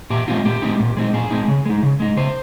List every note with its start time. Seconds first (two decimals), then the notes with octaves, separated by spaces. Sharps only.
0.10 A#2 G4
0.28 G#3 C4 D#4 F4
0.45 A#2 G4
0.62 G#3 C4 D#4
0.80 A#2
0.97 G#3 C4 D#4
1.13 A#2 G#4
1.31 G#3 C4 D#4
1.48 C#3
1.66 G#3 D#4
1.83 C#3
2.00 G#3 D#4
2.17 C#3 C5